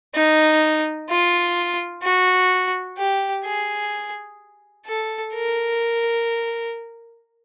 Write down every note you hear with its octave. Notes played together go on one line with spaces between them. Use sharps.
D#4
F4
F#4
G4
G#4
A4
A#4